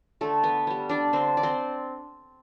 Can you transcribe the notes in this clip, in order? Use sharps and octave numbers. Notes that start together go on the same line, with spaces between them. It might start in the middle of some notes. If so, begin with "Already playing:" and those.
D3 A3 A4
B3 B4
G3 B3
D4 D5
D3 C4 C5
D5
C4 C5